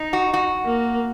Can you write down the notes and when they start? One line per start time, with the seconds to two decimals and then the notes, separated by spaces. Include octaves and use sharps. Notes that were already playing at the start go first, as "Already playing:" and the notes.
Already playing: D#4
0.13 F#4
0.34 F#4
0.65 A#3